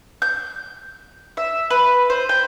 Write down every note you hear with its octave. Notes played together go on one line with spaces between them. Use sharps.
G6
E5
B4
C5
G5